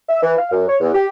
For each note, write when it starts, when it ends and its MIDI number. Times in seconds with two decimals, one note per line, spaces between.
0.09 0.19 76
0.22 0.35 52
0.38 0.49 77
0.52 0.65 42
0.68 0.76 73
0.81 0.93 40
0.94 1.07 67